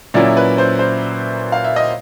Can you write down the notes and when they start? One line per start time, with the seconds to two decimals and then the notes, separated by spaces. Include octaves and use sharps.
0.14 A#2 F#3 A#3 C#4 E4 D5 E5
0.37 B4
0.58 C5
0.79 C5
1.52 F5
1.65 E5
1.76 D#5